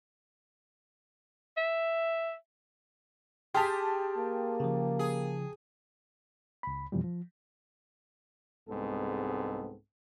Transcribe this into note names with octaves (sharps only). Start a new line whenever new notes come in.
E5
G4 G#4 G5 A5 C6 F6
A#3
C#3 F3
G#4
C#2 B5
F2 B2 E3 F3 G3
F3
C2 G#2 G#3 B3 C4 A4